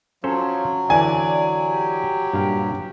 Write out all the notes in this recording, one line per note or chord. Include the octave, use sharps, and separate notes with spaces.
F3 F#3 C#4 A4 C5
D3 E3 D4 D5 G#5
G4
G2 A#2 F5